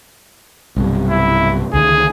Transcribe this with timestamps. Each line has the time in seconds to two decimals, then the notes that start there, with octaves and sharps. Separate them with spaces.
0.76 B1 G2 C3
1.10 E4
1.73 C#2 D3 D#3 G#4